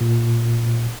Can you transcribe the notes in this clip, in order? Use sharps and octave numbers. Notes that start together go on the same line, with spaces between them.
A#2